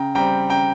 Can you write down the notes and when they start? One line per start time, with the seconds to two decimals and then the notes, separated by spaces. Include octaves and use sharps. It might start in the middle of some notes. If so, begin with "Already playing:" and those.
Already playing: C#3 G5 A#5
0.15 G3 C4 G5 A#5
0.50 C#3 G5 A#5